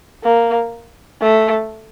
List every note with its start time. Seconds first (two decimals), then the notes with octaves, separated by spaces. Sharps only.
0.23 A#3
1.21 A3